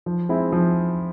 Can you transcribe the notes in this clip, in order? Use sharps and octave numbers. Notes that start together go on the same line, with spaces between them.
F3
G#3 C4 E4 G#4
F3